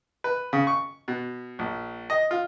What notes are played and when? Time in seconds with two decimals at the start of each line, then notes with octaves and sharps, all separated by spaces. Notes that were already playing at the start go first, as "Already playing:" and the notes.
0.24 B4
0.53 C#3
0.67 C#6
1.08 B2
1.59 A#1
2.10 D#5
2.31 F4